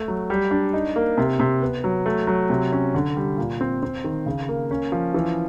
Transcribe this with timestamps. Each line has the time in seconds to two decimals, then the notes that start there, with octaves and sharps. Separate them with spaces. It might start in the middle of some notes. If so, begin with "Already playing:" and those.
Already playing: A3
0.08 F#3
0.30 G3
0.51 D4
0.73 D#4
0.96 A#3
1.18 C3
1.40 C3
1.62 B3
1.84 F#3
2.06 A3
2.27 F#3
2.50 C3
2.72 C#4
2.95 D3
3.17 G3
3.37 A#2
3.61 C4
3.83 C4
4.04 D#3
4.26 C#3
4.49 A#3
4.71 C#4
4.92 F3
5.14 E3